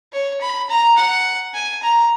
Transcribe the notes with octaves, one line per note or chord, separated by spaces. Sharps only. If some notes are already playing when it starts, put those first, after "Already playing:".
C#5
B5
A#5
F#5
G#5
A#5